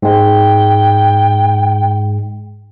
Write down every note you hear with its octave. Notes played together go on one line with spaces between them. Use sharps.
G#2 G#3 G5